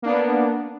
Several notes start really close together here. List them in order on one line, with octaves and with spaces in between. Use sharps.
A#3 D4 B3